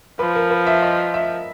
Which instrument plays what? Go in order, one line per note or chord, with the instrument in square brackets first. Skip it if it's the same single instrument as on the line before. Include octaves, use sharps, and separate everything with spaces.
[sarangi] F3 [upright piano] B4
[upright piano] A#4
B4
E5
D#5
E5